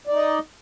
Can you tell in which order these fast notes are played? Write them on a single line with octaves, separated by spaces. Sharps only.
D5 D#4 D#5